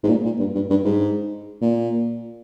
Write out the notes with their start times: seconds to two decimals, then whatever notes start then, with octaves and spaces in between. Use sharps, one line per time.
0.04 G#2
0.09 A#2
0.25 A#2
0.40 G2
0.55 G2
0.70 G2
0.85 G#2
1.62 A#2